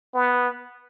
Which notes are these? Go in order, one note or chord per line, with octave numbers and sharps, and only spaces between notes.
B3